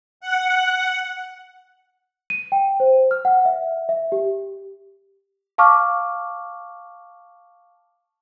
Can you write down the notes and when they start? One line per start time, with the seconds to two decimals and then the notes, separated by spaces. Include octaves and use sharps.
0.21 F#5
2.30 D#7
2.52 G5
2.80 C5
3.11 F6
3.25 F#5
3.45 E5
3.89 E5
4.12 G4
5.58 F5 A5 C#6 D6 F6